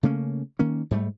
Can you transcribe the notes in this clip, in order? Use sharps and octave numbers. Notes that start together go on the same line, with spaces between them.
C#3 A3 A#3 C#4
D#3 A#3 C#4
G#2 G3 A3